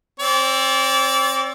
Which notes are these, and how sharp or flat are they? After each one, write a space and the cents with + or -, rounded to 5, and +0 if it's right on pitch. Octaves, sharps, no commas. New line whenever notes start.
C4 +25 D5 -30